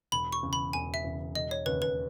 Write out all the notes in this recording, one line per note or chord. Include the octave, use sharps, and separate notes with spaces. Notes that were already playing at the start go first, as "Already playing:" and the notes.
E1 B5
C#6
E2 C#3
B5
E1 G#5
E5
E2 C#3
E1 D#5
C#5
D#2 C#3 B4
B4